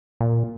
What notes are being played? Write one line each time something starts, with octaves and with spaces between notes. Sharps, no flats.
A#2